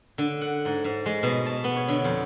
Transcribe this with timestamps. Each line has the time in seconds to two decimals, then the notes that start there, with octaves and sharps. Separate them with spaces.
0.18 D3
0.41 F#5
0.65 G#2
0.84 G#2
1.06 G#3
1.23 B2
1.46 A5
1.64 B3
1.76 C#5
1.88 D3
2.04 F2